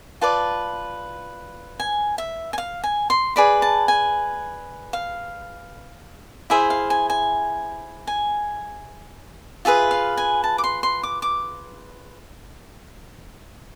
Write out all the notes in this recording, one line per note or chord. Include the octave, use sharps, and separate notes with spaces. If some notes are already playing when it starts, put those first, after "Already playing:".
F4 B4 D5 A5
G#5
E5
G#5
F5
G#5
C6
G#4 B4 D5 B5
A5
G#5
F5
E4 G#4 C5 E5
F5
G#5
G#5
G#5
F4 G#4 B4 E5
F5
G#5
A5
D6
C6
C6
D6
D6